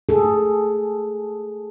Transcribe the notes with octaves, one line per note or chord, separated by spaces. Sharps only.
G#4 A4